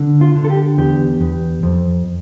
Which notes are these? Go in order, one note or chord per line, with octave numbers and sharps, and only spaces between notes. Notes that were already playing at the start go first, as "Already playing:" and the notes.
Already playing: D3
F4
D3
A4
G4
E2 G4
E2
F2